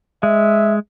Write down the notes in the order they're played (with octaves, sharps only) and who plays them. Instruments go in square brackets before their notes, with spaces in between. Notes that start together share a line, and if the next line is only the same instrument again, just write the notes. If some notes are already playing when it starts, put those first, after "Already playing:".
[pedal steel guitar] G#3 [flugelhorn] E5